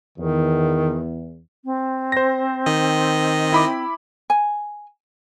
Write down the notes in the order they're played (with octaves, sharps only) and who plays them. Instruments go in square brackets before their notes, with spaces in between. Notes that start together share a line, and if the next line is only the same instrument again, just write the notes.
[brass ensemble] E2 [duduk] D#3
[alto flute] C4
[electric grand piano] C5 A#6
[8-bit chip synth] D#3 D#5
[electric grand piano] E4 B5 D6
[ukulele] G#5